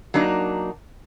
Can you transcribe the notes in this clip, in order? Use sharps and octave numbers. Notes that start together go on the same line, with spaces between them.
F#3 A#3 D4 D#4